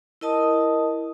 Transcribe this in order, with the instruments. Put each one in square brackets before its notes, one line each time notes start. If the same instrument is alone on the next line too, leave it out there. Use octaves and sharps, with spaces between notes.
[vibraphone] E4 A#4 D#5 A5 D#6